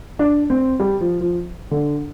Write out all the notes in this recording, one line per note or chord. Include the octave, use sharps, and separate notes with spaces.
D4
C4
G3
F3
F3
D3